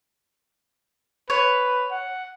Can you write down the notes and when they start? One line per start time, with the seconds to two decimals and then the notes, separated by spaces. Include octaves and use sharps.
1.30 B4 C#5
1.91 F#5